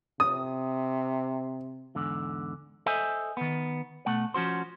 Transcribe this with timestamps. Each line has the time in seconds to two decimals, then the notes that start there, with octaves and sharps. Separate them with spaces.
0.20 C3 D#6
1.95 E2 G#2 D3
2.86 A4 C5 D#5 E5 G#5
3.37 D#3 B3
4.06 B2 A3 F#5
4.34 F3 C#4 F#4 C5